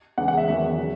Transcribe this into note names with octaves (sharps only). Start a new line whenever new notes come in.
E2 C#3 G#3 F#5
F#5
E5
E2 D#3 F#3 E5
C#3 F#3